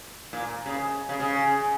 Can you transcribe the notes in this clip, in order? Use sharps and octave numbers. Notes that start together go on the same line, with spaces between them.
A#2
C#3
C#3
C#3